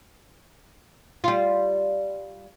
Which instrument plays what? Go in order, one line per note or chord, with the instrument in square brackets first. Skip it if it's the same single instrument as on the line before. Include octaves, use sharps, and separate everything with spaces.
[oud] G3 F4